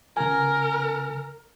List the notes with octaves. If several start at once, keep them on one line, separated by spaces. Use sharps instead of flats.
C#3 A#4 G#5